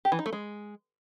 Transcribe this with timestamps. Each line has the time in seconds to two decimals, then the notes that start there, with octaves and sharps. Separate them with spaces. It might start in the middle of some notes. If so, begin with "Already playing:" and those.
0.05 G4
0.12 E3
0.19 D#4
0.26 A3
0.33 G#3